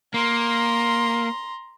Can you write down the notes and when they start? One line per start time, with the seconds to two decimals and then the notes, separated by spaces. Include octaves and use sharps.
0.14 A#3 A#5 C6